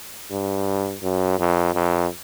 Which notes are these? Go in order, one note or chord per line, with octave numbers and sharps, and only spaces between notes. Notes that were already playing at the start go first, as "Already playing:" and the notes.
G2
F#2
F2
F2